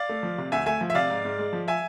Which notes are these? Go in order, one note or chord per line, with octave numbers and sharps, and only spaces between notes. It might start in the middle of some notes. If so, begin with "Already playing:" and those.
Already playing: D5 F5
A3
F3
C3
D2 E5 G#5
A3 E5 G#5
F3
E5
C3 D5 F5
G#2
G#2
G#3
F3
E5 G#5